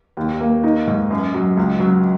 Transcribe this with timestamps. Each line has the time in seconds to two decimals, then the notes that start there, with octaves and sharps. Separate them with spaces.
0.17 D#2
0.40 A#3
0.64 D#4
0.87 G#2
1.11 F#2
1.34 F#3
1.57 C#2
1.80 F#3